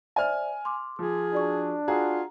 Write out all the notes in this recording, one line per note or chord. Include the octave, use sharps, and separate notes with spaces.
C5 D5 E5 G#5 F6
C6 D6
F3 G#4
D4 F#4 D5 C#6
F4 F#4 G#4 A#5